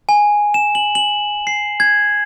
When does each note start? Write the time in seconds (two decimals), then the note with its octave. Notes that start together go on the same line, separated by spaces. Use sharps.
0.09 G#5
0.54 E7
0.75 F#7
0.95 F#7
1.47 C7
1.80 G#6